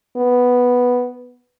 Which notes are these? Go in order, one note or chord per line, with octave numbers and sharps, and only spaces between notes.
B3